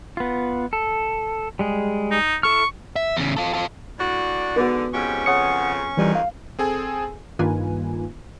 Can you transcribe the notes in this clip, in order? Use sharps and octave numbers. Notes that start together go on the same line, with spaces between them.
B3 F4
A4
G3 G#3 G#4
D#4
E4 A4 C#6 F6
E5
E2 C#3
F4 A4
F4 A4
A2 D4 F#4 D5
G#2 D3 B3 F#4
F2 G#2 C#4 G4 C#6
F2 C#3 F#5 D#6 C#7
F2 G#2 D#3 E3 G3
F5
C4 G#4 A4 G#5
G2 D#3 A#3 F4 B4 G#5